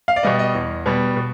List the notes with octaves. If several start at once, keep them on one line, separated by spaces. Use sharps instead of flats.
F5
D5
B2 G3 B3 D#5
D#5
E2
B2 G3 B3
B2